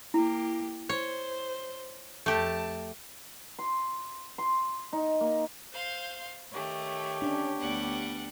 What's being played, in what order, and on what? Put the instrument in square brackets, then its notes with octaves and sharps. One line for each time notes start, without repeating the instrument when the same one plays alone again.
[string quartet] A#3 G4 [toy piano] E4
[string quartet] C5 [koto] C#5
[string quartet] F2 A5 [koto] A3 G4
[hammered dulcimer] C6
C6
D#4
A#3
[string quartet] C5 F5 C6
[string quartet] D#3 A3 [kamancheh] G4 C#5
[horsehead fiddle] C#4 [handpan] D4
[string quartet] D2 G3 F#5 [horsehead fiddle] B3